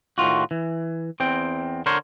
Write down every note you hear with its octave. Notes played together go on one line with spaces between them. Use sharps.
A2 D#3 F4 F#4
E3
E2 C4 G5
D3 A#4 C5 C#5